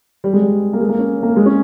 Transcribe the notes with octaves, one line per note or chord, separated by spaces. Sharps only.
G3
G#3
G3
A#3
G#3
A#3
C#4
A#3
G#3
C#4